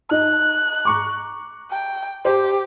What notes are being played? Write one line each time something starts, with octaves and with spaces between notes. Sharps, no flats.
D#4 D#5 F#6
A#5 C#6 D6
G5
G4 C5